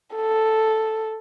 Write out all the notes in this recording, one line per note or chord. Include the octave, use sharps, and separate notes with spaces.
A4